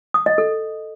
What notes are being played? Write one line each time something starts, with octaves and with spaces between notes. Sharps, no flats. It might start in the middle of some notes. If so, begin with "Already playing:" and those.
D#6
D#5
A4